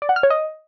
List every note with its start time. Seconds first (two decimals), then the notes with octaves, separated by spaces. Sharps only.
0.02 D5
0.09 F#5
0.16 F6
0.23 C#5
0.30 D#5